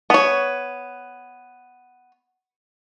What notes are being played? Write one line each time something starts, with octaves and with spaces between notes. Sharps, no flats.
B3 C#5